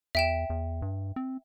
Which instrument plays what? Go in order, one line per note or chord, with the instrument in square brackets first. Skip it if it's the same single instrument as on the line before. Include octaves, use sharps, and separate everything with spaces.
[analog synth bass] E2 [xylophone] E5 G5 E7
[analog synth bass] E2
G2
C4